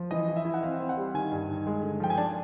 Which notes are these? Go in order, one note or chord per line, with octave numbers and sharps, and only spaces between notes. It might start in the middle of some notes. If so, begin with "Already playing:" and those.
Already playing: F3
E3 D#5
E4
E5
E4
F#5
C4 F5
C4
F#5
G3
D#3 G#5
G2
D#3
G#3
D3
F3 G5
G#5
D4 A5